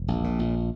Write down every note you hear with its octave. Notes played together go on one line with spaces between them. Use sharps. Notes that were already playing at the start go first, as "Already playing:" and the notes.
Already playing: E1
A#1
A#2
A#1